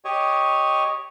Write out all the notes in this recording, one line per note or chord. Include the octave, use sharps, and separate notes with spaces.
G4 C#5 D#5